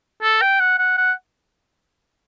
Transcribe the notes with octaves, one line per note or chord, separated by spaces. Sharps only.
A4
G5
F#5
F#5
F#5